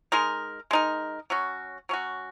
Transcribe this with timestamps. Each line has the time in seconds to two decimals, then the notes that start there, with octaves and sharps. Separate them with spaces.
0.12 G#3 D#4 A#4
0.71 G#3 D#4 A#4
1.30 F#3 C#4 F#4
1.89 F#3 C#4 F#4